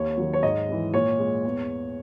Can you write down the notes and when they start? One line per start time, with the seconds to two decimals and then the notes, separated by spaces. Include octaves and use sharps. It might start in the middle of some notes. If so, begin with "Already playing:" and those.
Already playing: D#2 C#5
0.18 D#3 F#3
0.33 C#5
0.43 G#2 D#5
0.69 E3 G#3
0.94 A#2 C#5
1.19 G#3
1.45 E2